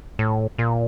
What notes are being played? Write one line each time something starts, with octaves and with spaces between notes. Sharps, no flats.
A2
A#2